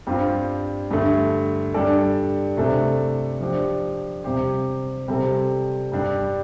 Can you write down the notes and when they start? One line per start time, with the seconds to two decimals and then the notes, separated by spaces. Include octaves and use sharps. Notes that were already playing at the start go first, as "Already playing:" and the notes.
0.07 G2 G3 C4 F4
0.91 G2 D3 A3
1.74 G2 G3 D4 A4 D5
2.57 C3 A3 D4 A4
3.40 F3 D4 G4 D5
4.24 C3 G3 C4 G4 C5
5.08 C3 G3 C4 A4
5.92 G2 G3 D4